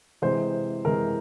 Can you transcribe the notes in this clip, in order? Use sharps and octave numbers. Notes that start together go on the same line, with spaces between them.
C3 E3 G#3 C5
C3 E3 G#3 A#4